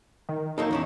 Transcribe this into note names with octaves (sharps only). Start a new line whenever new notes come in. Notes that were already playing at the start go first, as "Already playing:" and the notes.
D#3
F#3 A#3 D#4 A4
E2 C#4 E4